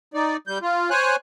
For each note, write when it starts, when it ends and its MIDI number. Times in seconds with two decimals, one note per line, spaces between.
0.14 0.37 63
0.14 0.37 74
0.47 0.58 55
0.47 0.58 91
0.62 0.90 65
0.91 1.16 72
0.91 1.16 73
0.91 1.16 80
0.91 1.16 90